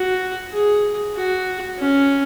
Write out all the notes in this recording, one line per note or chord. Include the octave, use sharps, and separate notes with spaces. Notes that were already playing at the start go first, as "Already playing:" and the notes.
Already playing: F#4
G#4
F#4
C#4